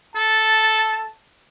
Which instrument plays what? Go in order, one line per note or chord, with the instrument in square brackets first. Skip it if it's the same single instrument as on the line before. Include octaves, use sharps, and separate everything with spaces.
[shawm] A4 [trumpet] A5